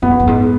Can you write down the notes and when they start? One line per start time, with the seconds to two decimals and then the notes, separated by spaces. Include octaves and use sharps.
0.02 F#2 B3
0.11 E2
0.19 F#2
0.27 G#2